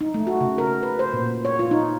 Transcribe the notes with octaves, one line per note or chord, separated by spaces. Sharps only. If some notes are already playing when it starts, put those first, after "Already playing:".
D#4
A3
F#4
C#3
A#4
B4
C5
A#2
C#5
F4
D#4